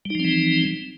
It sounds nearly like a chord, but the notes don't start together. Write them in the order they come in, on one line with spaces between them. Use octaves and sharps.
G3 D#4 F3 C4 E3